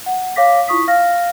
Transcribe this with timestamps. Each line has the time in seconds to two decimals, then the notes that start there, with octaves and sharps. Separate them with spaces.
0.06 F#5
0.36 C#5 F5 D6 A#6 B6
0.68 E4 F4 C#6 D#6 B6
0.88 F5 F6 A#6